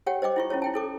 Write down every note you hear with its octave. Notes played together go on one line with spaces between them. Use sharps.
G4 C#5 F#5 G5
C5 D#5 G5 D6
E4 F4 C#6
C#4 E4 F4 C#5
E4 G5 A5
E4 A4 D6